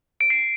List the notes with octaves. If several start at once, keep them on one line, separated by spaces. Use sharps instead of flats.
D7
C7